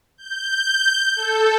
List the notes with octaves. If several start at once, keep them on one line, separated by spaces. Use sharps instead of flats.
G6
A4